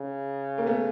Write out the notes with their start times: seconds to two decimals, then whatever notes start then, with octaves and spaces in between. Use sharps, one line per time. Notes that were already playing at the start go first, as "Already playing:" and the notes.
Already playing: C#3
0.58 A#3
0.66 A3 B3